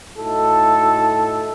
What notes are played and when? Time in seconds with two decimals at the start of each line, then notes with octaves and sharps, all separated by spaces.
0.17 A2 D#4 E4 F#4 A4